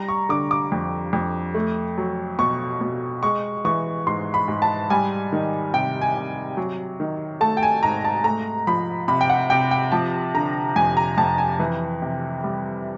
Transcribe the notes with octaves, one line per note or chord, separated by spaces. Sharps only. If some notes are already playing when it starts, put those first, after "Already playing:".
Already playing: G3 A#5
C#6
D3 D6
D6
F2
F2
A3
F#3
B2 C#6
B2
G#3 C#6
E3 C#6
G#2 C6
B5
G#2
A5
G3 G#5
D#3
C3 G5
G#5
C3
F#3
D#3
A3 A5
G5
G#5
G#2 A#5
A5
A3 A#5
F3 B5
C3 B5
G5
F#5
C3 G5
G5
F3 A5
D3 A#5
F2 G#5
A#5
F2 A5
G#5
E3
C3
G3